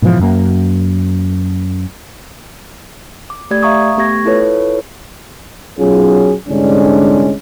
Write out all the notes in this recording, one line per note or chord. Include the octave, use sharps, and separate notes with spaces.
G#2 B2 E3 F3
F#2 A#3
D6
A3 G4 D5 G#6
E5 F5 A#5 C#6 D#6
A3 B3 G4 C#6 G#6 A#6
E4 F4 A4 B4 C#5
B1 F#3 C#4 F4 G#4
C2 G#2 D3 G#3 C#4 D4